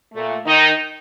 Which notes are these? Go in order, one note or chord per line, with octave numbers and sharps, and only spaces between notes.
A#2 A3
D#3 D#4